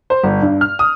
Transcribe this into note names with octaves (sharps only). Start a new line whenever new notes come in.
C5
G1
G2
F6
D#6